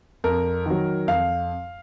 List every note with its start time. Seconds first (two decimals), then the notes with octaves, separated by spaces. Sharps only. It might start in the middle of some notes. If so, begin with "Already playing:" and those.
0.24 F2 A#4
0.66 D#3 F#3
1.07 F2 F5